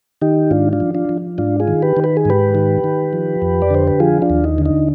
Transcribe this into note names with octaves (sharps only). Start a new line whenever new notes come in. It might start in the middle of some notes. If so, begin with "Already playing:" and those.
D#3 D#4 G4
G#2 D4 F4
D4 F4
F3
D4 F4
F3
G#2 D4 F4
F4 G#4
D#3
G4 B4
D#3
B4
G#4
G#2 G4 B4
D#3
D#3
F3
F2
D5
D3 C5
B4
F3 F4 G#4
D4 F4
D#2
D#4
D3
D#4